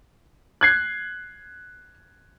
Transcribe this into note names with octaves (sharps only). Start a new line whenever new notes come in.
F#6 G#6 C7